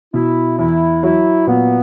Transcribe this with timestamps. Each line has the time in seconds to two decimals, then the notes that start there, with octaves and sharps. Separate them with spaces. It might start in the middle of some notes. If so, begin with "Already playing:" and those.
0.13 B2 E4
0.58 E2 E4
1.03 F#3 E4
1.47 A#2 B3